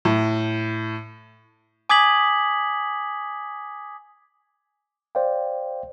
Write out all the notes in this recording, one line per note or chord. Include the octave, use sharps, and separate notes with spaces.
A2
G#5 D6 D#6 G#6 B6 F#7
C5 D5 F5 G5